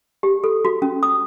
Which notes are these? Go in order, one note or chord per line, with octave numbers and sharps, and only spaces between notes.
G4
A4
F#4
C#4
D#6